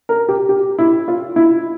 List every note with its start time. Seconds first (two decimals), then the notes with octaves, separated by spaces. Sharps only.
0.09 A#4
0.29 G4
0.49 G4
0.78 E4
1.08 F4
1.36 E4